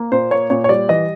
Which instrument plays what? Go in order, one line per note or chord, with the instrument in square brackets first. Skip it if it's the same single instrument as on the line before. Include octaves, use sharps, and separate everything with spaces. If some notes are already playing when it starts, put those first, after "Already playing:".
Already playing: [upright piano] A#3
A#2 C5
A#3 C#5
A#2 C#5
C#5
G3 D5
E3 D#5